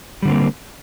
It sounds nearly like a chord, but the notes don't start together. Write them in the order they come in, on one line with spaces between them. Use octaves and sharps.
G3 D3 C4 A#3